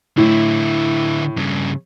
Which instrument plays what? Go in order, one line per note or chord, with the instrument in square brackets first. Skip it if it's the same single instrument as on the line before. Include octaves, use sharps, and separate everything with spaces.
[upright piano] A2 [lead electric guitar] D3 E4
[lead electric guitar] G2 C#3